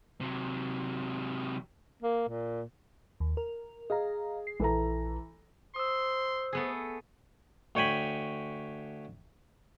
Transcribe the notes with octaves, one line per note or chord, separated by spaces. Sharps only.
C3 F#3
A#3
A#2
D#2
A#4
G#4 D#5 F5 A#5
C7
A#1 E3 A4 A#5
C5 C6 D#6 E6
A3 B3 G#4
D2 C#5 G5 G#5 B5